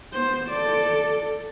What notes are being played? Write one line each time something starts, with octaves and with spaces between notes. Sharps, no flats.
B3 C5
A4 D5